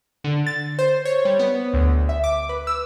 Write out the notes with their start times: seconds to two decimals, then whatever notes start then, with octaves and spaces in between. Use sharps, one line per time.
0.24 D3
0.46 A6
0.79 C5
1.05 C#5
1.25 G3
1.39 B3
1.73 D2
2.09 E5
2.24 D6
2.49 B4
2.67 E6